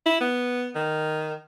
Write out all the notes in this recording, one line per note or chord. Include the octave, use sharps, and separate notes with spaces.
E4
B3
D#3